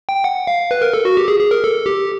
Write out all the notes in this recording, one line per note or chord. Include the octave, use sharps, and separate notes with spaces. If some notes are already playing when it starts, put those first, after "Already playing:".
G5
F#5
F5
B4
A#4
A4
F#4
G4
G#4
G#4
A#4
A4
G4